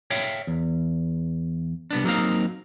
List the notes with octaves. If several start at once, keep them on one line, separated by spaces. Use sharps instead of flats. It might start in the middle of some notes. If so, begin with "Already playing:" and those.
C#5 E5 F5 G5
E2
C2 B3 D4
F#3 A3 A#3 C4 D#4 F5